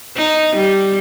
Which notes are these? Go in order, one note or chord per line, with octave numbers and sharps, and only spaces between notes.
D#4
G3